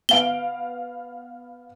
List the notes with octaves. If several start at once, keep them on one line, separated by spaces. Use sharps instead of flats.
B3 F5 D7 G7